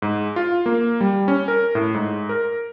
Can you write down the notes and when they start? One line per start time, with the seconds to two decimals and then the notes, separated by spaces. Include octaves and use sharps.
0.02 G#2
0.36 F4
0.66 A#3
1.01 G3
1.28 C#4
1.48 A#4
1.75 A2
1.94 G#2
2.29 A#4